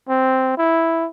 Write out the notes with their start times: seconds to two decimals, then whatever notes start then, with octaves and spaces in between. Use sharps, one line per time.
0.09 C4
0.58 E4